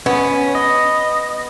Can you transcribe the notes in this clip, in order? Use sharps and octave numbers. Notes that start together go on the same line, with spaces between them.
B3 C#4
D#5